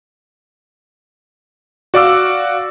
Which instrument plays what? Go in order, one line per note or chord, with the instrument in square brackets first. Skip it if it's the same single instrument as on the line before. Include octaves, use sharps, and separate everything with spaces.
[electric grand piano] F#4 D5 F5 D6 E6